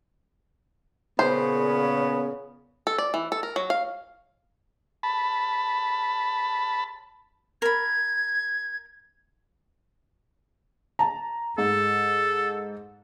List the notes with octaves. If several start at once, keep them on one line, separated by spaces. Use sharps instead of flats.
A#2 C#3 B3 C5
A4
D5
E3
A4
A#4
F#3
F5
A5 B5
A#4 B5 G#6
A5 A#5
G#2 A4